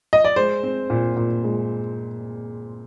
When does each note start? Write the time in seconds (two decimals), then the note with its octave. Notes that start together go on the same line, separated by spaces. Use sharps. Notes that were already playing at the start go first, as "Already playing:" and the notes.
0.13 D#5
0.25 D5
0.36 G#3 C5
0.63 C4
0.90 A#2
1.16 A#2
1.44 G#3